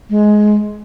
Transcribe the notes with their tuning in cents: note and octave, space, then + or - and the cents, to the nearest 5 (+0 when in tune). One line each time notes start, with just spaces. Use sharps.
G#3 +15